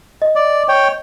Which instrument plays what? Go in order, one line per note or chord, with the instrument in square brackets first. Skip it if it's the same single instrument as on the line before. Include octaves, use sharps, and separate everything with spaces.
[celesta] D#5
[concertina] D5
C#5 G5